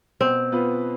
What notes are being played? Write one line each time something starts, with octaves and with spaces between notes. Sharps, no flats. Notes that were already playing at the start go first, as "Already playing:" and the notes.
B2 C4
B3 F4 B4